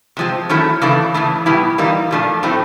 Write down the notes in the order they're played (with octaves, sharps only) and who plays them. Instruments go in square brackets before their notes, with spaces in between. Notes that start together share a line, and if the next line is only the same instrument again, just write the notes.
[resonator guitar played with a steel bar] C3 F3 G#3 C4
D#3 F#3 A3 C#4 E4
C#3 E3 A3 D4
C#3 E3 A3
B2 G3 B3 E4
E3 G3 A#3 D#4
A#2 F3 A3 D4
A2 F#3 A3 C4 D#4